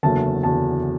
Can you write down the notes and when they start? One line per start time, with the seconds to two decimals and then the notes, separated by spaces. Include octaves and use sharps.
0.03 F#1 E2 D3 F#3 A5
0.43 F#1 E2 D3 F#3 A5